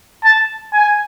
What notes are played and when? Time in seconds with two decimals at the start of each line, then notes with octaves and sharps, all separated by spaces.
0.25 A5
0.73 G#5